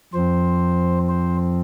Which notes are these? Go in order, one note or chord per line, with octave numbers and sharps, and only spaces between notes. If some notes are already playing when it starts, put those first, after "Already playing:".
F2 F3 C4 C5
C5